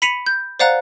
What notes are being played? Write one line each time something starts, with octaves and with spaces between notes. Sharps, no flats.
B5 B6 C#7 D#7 F7
G6
C5 D5 F5 F#5 A#5 F#6